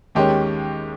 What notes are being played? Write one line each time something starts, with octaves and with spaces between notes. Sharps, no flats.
D#2 D#3 G#3 C#4 G4